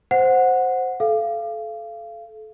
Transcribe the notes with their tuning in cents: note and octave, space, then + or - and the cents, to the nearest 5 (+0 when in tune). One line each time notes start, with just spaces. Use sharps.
C5 +0 F#5 -10
A4 -30 F5 -30